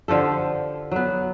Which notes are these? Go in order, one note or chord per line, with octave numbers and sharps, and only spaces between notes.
D3 F3 G4 A4
F#3 B3